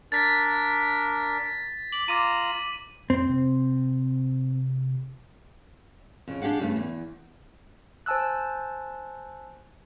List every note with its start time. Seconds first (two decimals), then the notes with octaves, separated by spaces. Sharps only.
0.12 D4 A#4 A6 B6
1.93 D6 F#7
2.08 F4 A#5 D6 D#7
3.10 F2 C4
3.29 C3
6.28 F2 C#3
6.42 D4 G4 G#4 F5 F#5
6.60 G2 C#3 A3 B3
6.76 E2
8.06 C5 G#5 A5 E6 F#6